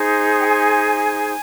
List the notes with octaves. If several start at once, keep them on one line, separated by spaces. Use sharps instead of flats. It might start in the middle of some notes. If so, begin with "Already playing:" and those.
Already playing: D#4 G#4 C5
G5
G#5